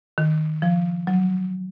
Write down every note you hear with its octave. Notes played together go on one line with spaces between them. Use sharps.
D#3
F3
F#3